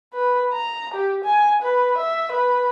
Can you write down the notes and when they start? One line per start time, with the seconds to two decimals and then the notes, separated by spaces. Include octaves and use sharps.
0.14 B4
0.53 A#5
0.94 G4
1.24 G#5
1.62 B4
1.98 E5
2.32 B4